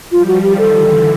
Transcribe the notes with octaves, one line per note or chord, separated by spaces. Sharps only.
F3 G3 F4
F#4
D#3 F3 G4
A4
D3 E3